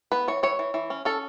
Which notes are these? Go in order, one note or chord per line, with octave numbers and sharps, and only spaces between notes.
B3 B4
E3 C#5
E3 C#5
E3
E3
C#4
C#4 A4